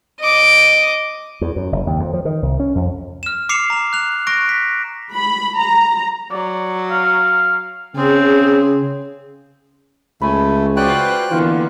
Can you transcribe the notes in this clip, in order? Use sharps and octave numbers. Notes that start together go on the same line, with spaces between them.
D#5 D6
E2
F#2
F#1
D#2
F2
F3
D#3
C2
C#4
F2
F6 E7
D6 C7 C#7 E7 F7
A#5 F7
F#6 F7
C#6 F#6 A#6 D7
B6
B5
A#5
F#3 D5
F5
C#3 C4 G#4
C#2 A3 G#5 B5
F4 F#4 B4 C5 D5 D#5 G5 F#6
D3 E3 A#3 B3 F4